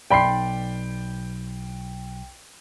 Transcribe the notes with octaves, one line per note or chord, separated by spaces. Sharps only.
B1 D5 G5 B5 C6 C7